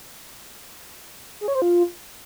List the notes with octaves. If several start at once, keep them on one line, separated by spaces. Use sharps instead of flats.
G#4
C#5
C5
F4